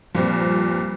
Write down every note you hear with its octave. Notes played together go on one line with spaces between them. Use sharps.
G2 A#2 F3 C4